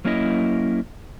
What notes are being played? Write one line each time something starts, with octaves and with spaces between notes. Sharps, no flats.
F#3 A#3 C#4 D4 E4 D#5